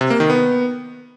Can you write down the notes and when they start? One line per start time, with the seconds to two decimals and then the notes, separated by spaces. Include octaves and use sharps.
0.01 C3
0.10 A#3
0.20 D#3
0.30 B3